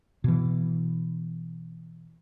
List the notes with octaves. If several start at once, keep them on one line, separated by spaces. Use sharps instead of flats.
B2 E3